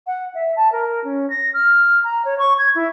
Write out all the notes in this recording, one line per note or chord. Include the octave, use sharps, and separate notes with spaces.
F#5
E5
A5
A#4
C#4
A#6
F6
A#5
C#5
C#6
G#6
E4